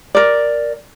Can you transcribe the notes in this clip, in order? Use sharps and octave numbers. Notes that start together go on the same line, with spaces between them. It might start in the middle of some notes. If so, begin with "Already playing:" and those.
A#4 D5